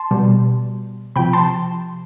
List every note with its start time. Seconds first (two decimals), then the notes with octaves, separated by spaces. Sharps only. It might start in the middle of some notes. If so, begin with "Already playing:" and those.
Already playing: A5 C6
0.11 B2 G3
1.16 C3 F3 G5 B5
1.33 A5 C6